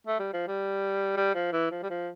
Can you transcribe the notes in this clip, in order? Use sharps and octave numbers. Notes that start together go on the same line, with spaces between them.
A3
G3
F3
G3
G3
F3
E3
F3
G3
F3